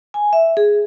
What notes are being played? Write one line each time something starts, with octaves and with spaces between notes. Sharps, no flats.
G#5
E5
G#4